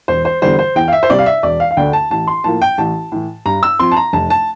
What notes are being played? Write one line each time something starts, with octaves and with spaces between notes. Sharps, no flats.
E1 C5
C5
E2 D3 G3 C5
C5
E2 G5
F5
E5
C5
C3 G3 D5
F5
E5
E1 D5
F5
F5
D2 D3 A3 D4 G5
A5
A1 A5
C6
A2 F3 A#3 A5
G5
A1 A5
A2 E3
G2 A#5
E6
F3 C4 C6
A5
A#5
F1 A5
A5